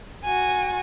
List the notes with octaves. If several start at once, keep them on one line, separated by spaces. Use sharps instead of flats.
F#4 G#5